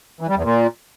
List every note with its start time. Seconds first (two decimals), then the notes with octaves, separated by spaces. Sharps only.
0.21 E3
0.28 G3
0.36 E2
0.44 A#2